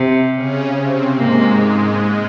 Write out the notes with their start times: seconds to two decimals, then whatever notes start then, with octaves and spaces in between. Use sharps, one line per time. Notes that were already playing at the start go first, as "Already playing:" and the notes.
Already playing: C3
0.34 C#3 C#4
0.75 C3 C4
1.17 G#2 G#3 A#3